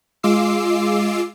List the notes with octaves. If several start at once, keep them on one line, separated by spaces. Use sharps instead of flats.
G#3 F4 D6 E6 C7